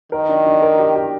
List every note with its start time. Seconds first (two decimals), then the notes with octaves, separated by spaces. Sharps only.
0.12 D#3 A#4
0.29 D4
0.46 D4
0.62 A#4
0.79 G4
0.96 G4